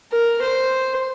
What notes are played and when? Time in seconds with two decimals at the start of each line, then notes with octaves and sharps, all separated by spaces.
0.12 A#4
0.41 C5